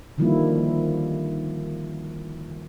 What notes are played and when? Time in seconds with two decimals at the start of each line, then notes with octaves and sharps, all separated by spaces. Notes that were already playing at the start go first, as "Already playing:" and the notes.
0.18 D3 D#3 F3 G3 A#3 E4